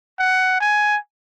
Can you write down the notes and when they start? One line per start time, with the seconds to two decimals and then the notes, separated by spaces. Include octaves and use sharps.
0.19 F#5
0.60 G#5